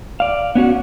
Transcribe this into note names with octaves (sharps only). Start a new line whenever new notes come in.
D5 F5
B3 C#4 F#4 F#5